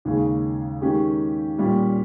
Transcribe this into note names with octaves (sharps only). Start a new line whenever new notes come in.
D#2 C#3 G#3 C#4 G#4
D#3 G#3 C#4 G4
A#2 G3 C#4